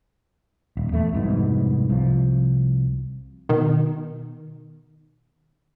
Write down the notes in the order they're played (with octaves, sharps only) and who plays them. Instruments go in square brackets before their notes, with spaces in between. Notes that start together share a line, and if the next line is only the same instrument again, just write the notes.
[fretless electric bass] D#1
E2 A3
F1 C2 G#2 B2
C2 F3
[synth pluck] B2 D#3